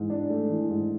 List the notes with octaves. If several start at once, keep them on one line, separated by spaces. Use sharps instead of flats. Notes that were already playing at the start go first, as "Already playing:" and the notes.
Already playing: G#2 E3
D4
A3
E3
G#2